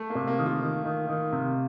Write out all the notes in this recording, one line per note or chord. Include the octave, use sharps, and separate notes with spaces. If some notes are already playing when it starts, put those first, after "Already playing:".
Already playing: A3
A#3
C3
A#3
D#3
F4
D#3
D#3
D#3
C3